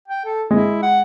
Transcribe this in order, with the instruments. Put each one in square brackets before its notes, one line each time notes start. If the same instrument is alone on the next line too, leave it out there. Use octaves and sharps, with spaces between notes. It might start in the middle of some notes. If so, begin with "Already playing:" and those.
[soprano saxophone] G5
A4
[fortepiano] G#3 [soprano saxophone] E4
[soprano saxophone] F#5